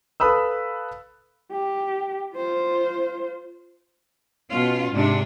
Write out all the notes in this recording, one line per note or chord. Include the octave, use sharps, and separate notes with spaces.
A4 B4 F5 B5 D#6 E6
G4
F4 C5
B2 C#4 F4
G#2 C3 D4